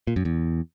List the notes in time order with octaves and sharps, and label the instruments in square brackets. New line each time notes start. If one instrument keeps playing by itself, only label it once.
[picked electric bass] A#2
F#2
E2